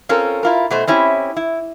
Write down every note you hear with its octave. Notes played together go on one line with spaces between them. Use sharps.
C4 C#4 F4 A4 A#4
E4 F4 A#4
B2 A3 C5
C4 C#4 E4 G4
E4